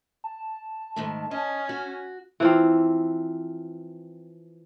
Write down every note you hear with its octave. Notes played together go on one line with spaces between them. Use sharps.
A5
G#2 D#3 A3
C#4 D#5
F#4
E3 F3 C4